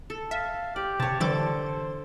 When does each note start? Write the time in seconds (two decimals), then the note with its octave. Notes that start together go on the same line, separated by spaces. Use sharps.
0.10 A4
0.31 E5 F5
0.76 G4 D5
1.00 C3 C#5 A5
1.20 D3 E3 G3 A4 C5 D6 A6